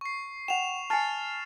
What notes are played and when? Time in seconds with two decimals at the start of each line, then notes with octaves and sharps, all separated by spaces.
0.01 C#6 C7
0.48 F#5 G5 E7 F7
0.90 G#5 A5 F6 A6 C7